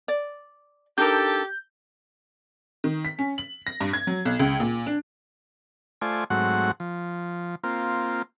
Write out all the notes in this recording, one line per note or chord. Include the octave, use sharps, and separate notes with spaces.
D5
D4 D#4 G4 A4 A#4 G6
D#3
B6
C#4
F#7
A#6
G2
G#6
F#3
B1
C#2
A#2
D4
A3 F4 C5 D5 G#5
G#2 F#3 A3 C4 F#4 F#5
F3
A#3 C4 F4